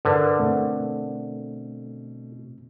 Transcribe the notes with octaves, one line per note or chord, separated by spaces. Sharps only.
G2 D3 A#4 B4
B2 A3 C4